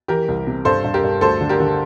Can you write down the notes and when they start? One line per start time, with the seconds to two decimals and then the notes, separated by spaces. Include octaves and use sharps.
0.08 E3 G4 A#4
0.28 C2
0.47 C3
0.65 G2 A4 C5
0.84 G2
0.94 G4 A#4
1.04 G2
1.21 D2 A4 C5
1.41 D3
1.49 G4 A#4
1.60 D3